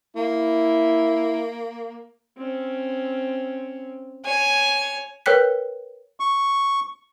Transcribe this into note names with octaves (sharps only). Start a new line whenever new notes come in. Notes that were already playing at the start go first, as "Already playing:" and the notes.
A#3 E4
C4 C#4
C#5 G#5
A#4 B4 C#5 G5 F#6 B6
C#6